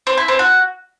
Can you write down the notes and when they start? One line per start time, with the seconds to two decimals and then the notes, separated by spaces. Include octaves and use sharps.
0.07 C4
0.18 E4
0.28 C4
0.39 F#4